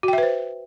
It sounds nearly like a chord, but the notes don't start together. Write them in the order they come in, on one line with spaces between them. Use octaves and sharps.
F#4 G5 E5 B4 C5